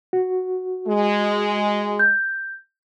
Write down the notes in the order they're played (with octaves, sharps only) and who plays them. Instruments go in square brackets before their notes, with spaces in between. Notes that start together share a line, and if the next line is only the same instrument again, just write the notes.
[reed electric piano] F#4
[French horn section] G#3
[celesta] G6